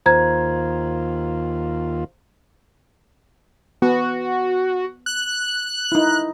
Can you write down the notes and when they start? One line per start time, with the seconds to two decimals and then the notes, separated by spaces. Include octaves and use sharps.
0.06 D#2 F4 C5 A#5 G#6
3.82 B3 F#4
5.06 F#6
5.92 D#4 E4